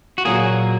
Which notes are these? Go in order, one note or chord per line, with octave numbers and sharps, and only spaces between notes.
F#4
A#2 F#3 A#3 G#4